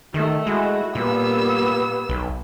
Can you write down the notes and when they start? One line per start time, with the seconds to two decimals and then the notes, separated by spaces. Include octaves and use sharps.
0.14 D#3 A3
0.47 G#3 E4 F#4
0.95 A#2 G3 A#3 B3 E6
2.09 B1